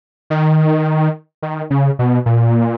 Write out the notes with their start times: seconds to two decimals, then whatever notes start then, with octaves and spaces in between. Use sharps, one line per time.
0.30 D#3
1.42 D#3
1.70 C#3
1.99 B2
2.26 A#2